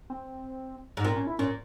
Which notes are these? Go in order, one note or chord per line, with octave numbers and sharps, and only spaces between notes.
C4
G#2
A#2 C4
C#4
E4
A#2 C#4